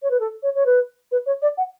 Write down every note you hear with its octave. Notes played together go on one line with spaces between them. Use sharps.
C#5
B4
A4
C#5
C#5
B4
B4
C#5
D5
F#5